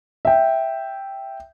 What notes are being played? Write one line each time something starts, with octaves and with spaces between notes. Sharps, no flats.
E5 G5